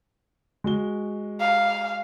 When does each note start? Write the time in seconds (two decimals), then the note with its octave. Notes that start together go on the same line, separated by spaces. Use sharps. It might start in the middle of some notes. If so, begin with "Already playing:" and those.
0.64 G#3 F#4 G7
1.40 F5